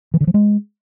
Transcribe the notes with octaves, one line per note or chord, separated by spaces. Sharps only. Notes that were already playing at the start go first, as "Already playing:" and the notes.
E3
D3
F3
G#3